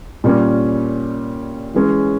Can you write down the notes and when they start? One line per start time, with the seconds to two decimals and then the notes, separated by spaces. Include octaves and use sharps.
0.24 A#2 G3 C#4
1.74 E3 G#3 C#4